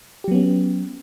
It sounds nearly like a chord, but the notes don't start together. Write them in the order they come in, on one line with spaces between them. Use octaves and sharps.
G4 F#3 B3 C#4